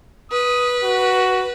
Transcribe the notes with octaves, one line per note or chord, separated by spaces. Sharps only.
B4 D#6
F#4